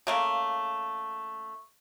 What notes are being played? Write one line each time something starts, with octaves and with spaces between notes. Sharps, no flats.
C#3 A3 A#3